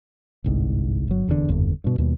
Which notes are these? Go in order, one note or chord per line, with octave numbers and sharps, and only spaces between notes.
G1 C2 G#2
G1 F#3
F1 E2 G2 D3
F#1 E2 G2 D3
G2 B2
D#2 B2 G3